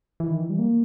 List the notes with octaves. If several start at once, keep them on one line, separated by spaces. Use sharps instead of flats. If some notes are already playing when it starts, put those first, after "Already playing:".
E3
D#3
E3
G3
A#3